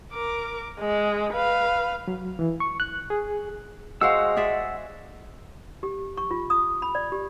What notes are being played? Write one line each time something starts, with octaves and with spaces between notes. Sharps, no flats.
A#4 D6
G#3
B4 F5
F#3
E3
C#6
F#6
G#4
G#3 F#4 C5 F5 F#5 E6
G#4 D5 E5
G4
C#6
F4
D#6
B5
D5
G4